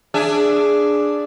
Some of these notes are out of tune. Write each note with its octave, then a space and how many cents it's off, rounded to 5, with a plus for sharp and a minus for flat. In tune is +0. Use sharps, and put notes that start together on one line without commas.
D4 +0 G#4 +0 E5 +20